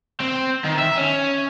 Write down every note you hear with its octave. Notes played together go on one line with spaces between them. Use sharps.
C4
D#3
E5
C#4